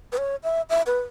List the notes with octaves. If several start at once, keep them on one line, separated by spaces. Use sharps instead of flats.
B4
C#5
E5
E5
B4